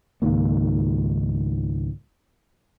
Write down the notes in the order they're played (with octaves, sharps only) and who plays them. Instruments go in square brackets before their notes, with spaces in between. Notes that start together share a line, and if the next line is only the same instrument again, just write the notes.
[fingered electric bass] C#2 G#2 D#3 A#3